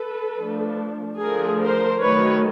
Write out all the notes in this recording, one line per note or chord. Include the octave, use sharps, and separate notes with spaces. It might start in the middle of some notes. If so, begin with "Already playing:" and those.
Already playing: A4 B4
F3 A3 D4
D3 F3 A3 G#4 A#4
A#4 C5
D#3 F#3 A3 B4 C#5